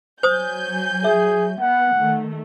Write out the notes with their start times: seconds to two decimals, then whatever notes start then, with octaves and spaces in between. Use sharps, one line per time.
0.23 F#3 C5 G#5 D#6 G6
1.04 G#4 E5
1.60 B3 F#5
1.96 D#3 A3